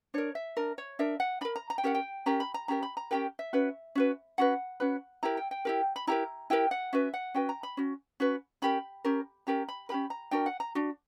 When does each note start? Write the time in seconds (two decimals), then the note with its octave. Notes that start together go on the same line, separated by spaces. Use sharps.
0.14 D4 A#4 C#5
0.35 E5
0.57 D4 A#4
0.78 C#5
0.99 D4 A#4 E5
1.20 F#5
1.41 D4 A#4 B5
1.56 A#5
1.70 A#5
1.78 G5
1.83 C#4 G4 A#4 F#5
1.95 G5
2.26 C#4 G4 A#4 A#5
2.40 B5
2.54 A#5
2.68 C#4 G4 A#4 A#5
2.83 B5
2.97 A#5
3.11 C#4 G4 A#4 G5
3.39 E5
3.53 C#4 F#4 B4
3.95 C#4 F#4 B4
4.38 C#4 F#4 B4 F#5
4.80 C#4 F#4 B4
5.23 E4 G4 A#4 A#5
5.37 G5
5.51 G5
5.65 E4 G4 A#4
5.96 B5
6.07 E4 G4 A#4 A#5
6.50 E4 G4 A#4 G5
6.71 F#5
6.93 C#4 F#4 B4 E5
7.14 F#5
7.34 C#4 F#4 B4 G5
7.49 A#5
7.63 B5
7.77 C#4 F#4
8.20 C#4 F#4 B4
8.62 C#4 G4 A#4 B5
9.04 C#4 G4 A#4
9.47 C#4 G4 A#4 A#5
9.68 B5
9.89 C#4 G4 A#4 B5
10.10 A#5
10.31 D4 F#4 A#4 G5
10.46 F#5
10.60 A#5
10.75 D4 F#4